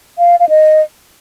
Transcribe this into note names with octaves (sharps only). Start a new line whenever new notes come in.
F5
F5
D#5